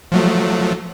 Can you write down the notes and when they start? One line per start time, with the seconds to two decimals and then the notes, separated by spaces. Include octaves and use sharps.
0.12 F3 F#3 A3